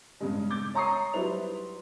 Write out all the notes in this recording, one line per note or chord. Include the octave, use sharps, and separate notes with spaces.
G2 C#3 G#3
D6 G6 A6
C#5 A#5 C#6 D#6 C7
F#3 G3 E4 B4 C5 F7